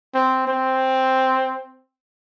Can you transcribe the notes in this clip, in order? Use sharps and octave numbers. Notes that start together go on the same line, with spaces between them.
C4
C4